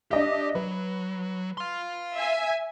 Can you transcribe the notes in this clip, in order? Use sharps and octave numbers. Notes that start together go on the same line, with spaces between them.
D4 G4 D#5 E5
F#3 B4
F5 C6
E5 G#5